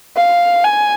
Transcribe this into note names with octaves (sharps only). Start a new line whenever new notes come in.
F5
G#5